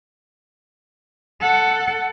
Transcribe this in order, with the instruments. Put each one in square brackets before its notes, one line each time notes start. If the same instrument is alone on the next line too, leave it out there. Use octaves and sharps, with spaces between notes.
[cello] A4 F#5